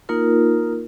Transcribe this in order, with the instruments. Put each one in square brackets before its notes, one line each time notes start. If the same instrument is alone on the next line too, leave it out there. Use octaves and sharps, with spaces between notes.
[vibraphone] A#3 D#4 F4 A#4